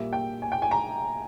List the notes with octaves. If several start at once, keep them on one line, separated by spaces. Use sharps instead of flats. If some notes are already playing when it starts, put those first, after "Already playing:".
Already playing: A#2 G3 A#3 E5
G5
G#5
G5
G#5
A#5